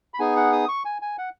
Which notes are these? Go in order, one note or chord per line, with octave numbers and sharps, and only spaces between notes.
B5
B3 D#4 G#4 G#5
F#5
D#6
C#6
G#5
G#5
F#5